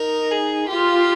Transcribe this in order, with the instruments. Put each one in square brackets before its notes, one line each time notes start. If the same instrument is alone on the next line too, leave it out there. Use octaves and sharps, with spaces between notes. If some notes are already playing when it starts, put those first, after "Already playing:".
Already playing: [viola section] D#4 [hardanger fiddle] A#4
[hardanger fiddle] G#4
[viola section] F4 [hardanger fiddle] G4